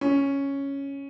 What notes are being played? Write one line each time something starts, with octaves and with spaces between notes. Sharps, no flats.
C#4